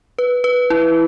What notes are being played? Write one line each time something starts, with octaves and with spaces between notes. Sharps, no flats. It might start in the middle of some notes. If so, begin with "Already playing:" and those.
B4
B4
E4